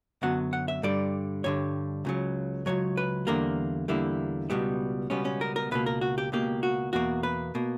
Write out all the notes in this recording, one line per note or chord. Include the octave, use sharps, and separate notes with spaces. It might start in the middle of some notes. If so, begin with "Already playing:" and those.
F#2 D3 F#3 B3 F#5
F#5
E5
G2 D3 G3 D5
G2 D3 G3 C#5
C#2 C#3 F#3
C#2 C#3 F#3 C#5
B4
E2 D3 G3 A#3 A#4
E2 D3 G3 A#3 E4
C#2 B2 G3 B3
C#2 B2 G3 B3 C#4
C#4
A#4
A#4
C#2 B2 A#3 B4
A#4
F#4
G4
C#2 B2 A#3 G4
F#4
E2 B2 A#3 F#4
B4
B2 A#3